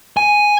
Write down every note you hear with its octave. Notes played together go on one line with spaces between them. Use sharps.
G#5